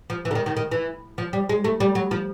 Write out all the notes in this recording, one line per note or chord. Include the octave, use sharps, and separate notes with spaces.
F3
E3
D3
D#3
D#3
D#3
E3
F3
G3
G#3
A3
G3
F#3
F3